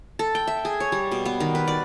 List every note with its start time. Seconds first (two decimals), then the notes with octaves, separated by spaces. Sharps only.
0.19 A4
0.35 G5
0.47 E5
0.65 G#4
0.80 C#5
0.92 G3
1.11 B2
1.26 B3
1.40 D#3
1.55 B4
1.68 D5